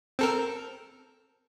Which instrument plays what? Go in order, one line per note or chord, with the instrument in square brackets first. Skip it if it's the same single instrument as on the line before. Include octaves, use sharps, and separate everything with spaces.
[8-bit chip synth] C4 A4 A#4